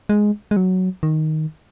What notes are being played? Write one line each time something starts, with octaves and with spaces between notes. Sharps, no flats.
G#3
G#3
F#3
D#3